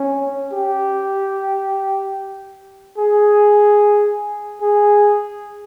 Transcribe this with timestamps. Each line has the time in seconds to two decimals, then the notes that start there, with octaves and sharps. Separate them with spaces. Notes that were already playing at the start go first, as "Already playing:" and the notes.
Already playing: C#4
0.52 G4
2.98 G#4
4.61 G#4